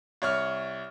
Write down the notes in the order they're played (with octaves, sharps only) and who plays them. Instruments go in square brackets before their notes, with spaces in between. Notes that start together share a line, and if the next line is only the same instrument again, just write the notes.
[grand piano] C2 C#5 C#6 F6